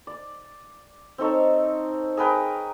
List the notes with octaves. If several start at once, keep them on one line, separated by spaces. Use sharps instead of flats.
D5
C4 D#4 A4 C#5
G#4 A#4 B4 G5